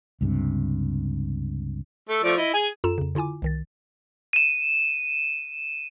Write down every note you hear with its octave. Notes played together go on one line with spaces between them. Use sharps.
C#2 G2 C3
A3 A4
F3 A3 D5
E4 D#5
G#4 G#5
F#2 F4 A4 A#5 E7
F2 C#3
D3 E4 F4 G#5 D6
C2 D#3 A6
D#7 E7